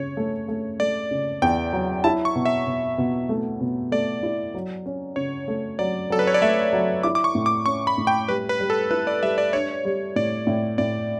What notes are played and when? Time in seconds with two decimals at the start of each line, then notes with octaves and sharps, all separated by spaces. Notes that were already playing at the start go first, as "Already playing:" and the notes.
Already playing: C#3 C#5
0.17 A3
0.48 A3
0.79 A3 D5
1.11 C#3
1.42 E2 G5
1.73 F#3
2.04 E4 A5
2.25 C#6
2.36 B2
2.46 E5
2.67 B2
2.98 B2
3.29 A3
3.61 B2
3.92 A3 D5
4.23 E4
4.54 F#3
4.86 C#4
5.16 C#3 C#5
5.48 A3
5.79 F#3 D5
6.10 F#3 A4
6.19 B4
6.27 C#5
6.34 D5
6.41 A3 E5
6.73 F#3
7.03 E4 D6
7.15 D6
7.24 C#6
7.35 A2
7.46 D6
7.66 C#4 C#6
7.87 B5
7.98 A2
8.07 G5
8.28 G3 B4
8.49 B4
8.60 G3
8.70 A4
8.91 E4 B4
9.07 D5
9.22 G3 E5
9.38 D5
9.53 D4 C#5
9.85 G3
10.16 A2 D5
10.47 A2
10.78 A2 D5